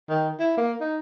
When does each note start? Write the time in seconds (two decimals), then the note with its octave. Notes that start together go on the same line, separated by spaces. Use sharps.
0.09 D#3
0.40 E4
0.57 A#3
0.81 D#4